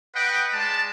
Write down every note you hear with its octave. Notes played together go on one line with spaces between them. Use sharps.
B4 D#5 F#5 G5
G#3 D5 A5